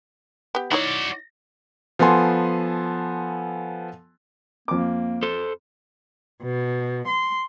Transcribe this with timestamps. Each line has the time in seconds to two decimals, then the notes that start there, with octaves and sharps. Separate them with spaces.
0.55 B3 G4
0.72 D#4 E4 F#4 C#5 D5
1.99 F3 B3 A4 G#5 C6
4.68 F2 A#3 D6
5.23 A4 C5
6.42 B2
7.08 C6